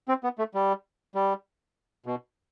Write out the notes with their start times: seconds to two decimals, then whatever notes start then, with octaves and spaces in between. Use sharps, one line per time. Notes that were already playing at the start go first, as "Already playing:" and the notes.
0.08 C4
0.24 B3
0.38 A3
0.54 G3
1.15 G3
2.06 B2